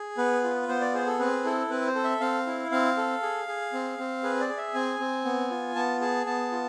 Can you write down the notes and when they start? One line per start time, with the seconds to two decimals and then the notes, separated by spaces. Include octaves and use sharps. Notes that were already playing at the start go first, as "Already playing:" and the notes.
Already playing: G#4
0.18 B3 B4
0.44 F4
0.69 B3 C5
0.81 D5
0.94 G#4 C5
1.07 A4
1.19 C4 B4
1.44 E4 A4
1.70 C4 B4
1.87 C5
1.95 A4
2.04 E5
2.21 C4 F5
2.47 E4
2.72 C4 F5
2.97 A4
3.22 G#4
3.47 G#4
3.73 C4
3.98 C4
4.23 G#4 B4
4.40 D5
4.49 G#4
4.57 E5
4.74 C4 G#5
4.99 C4
5.25 B3
5.50 F4
5.76 B3 A5
6.01 G#4 A5
6.26 B3 A5
6.52 F4